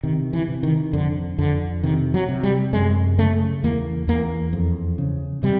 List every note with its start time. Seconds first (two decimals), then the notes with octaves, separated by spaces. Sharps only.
0.03 C3 D#3
0.33 E3
0.48 C3
0.63 D#3
0.93 F2 D3
1.38 F2 D3
1.83 C3 D#3
2.14 F#3
2.29 C3
2.43 G3
2.73 F#2 G#3
3.18 C#3 A3
3.64 E2 A#3
4.08 E2 A#3
4.53 F2
4.98 C#3
5.43 C3 G3